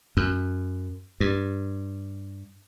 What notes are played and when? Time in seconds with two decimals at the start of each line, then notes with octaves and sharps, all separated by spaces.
0.17 F#2
1.20 G2